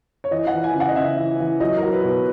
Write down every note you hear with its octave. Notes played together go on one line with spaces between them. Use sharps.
C#5
E3 D#5
F#5
E3
G#5
C#3
F#5
D#5
C#3 E5
E3
E3
F#3 D#5
A#4
F#3
B4
B2
B4